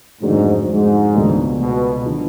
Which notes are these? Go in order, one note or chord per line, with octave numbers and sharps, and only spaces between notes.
F2 G#2 D3 F#3 A3 D4
G#2
C#2 B2 A3 D4
B2
D3 F3